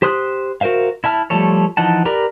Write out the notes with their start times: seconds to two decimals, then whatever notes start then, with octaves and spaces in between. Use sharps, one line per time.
0.02 G4 C5 C6 D#6 F#6
0.61 F#4 A#4 C5 E5 F5
1.04 E4 E5 A5 F6
1.30 F3 G3 A3 A4 C#5
1.77 E3 F3 D#4 F#5 A5
2.05 G4 A#4 B4 D5 A#5